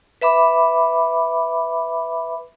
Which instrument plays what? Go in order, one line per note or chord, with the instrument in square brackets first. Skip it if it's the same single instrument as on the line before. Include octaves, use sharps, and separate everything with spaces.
[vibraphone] B4 E5 B5 D6